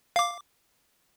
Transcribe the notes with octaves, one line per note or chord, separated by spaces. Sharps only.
F5 D6